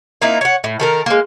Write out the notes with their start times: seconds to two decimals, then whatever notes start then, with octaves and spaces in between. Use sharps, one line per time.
0.22 A#3 C4 D#4 E4
0.41 C#5 F#5
0.64 A2
0.80 D#3 A4 A#4
1.06 G#3 A#3